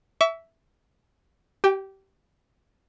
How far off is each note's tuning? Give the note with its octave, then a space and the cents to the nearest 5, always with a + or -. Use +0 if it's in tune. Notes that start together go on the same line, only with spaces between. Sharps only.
E5 +0 C#6 +40
G4 -20 G5 +20